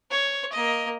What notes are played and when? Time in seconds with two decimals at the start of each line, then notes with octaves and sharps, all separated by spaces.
0.11 C#5
0.52 A#3 D#5